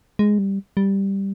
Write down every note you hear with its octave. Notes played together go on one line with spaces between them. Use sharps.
G#3
G3
G3